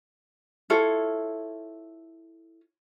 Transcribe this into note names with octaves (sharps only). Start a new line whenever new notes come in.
E4 F4 A4 C#5